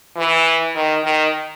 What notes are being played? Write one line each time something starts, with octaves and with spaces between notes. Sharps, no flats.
E3
D#3
D#3